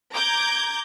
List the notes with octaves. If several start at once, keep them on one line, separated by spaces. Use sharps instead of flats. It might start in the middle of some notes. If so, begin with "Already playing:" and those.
A#5 D6 G6 G#6